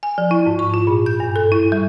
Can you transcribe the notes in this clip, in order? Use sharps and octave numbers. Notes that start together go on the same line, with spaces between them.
G#5
F3
E4
G#2
C#6
F4
A#2
G6
G2
A4
E4
G3